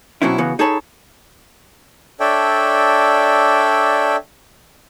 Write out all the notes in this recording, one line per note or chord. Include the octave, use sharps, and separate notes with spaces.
B2 F#3 C4 C#4 E4
C#3 E3 B3 F#4
D#4 G#4 A4 C#5 A5 B5
D4 A4 C#5 D5 E5 G5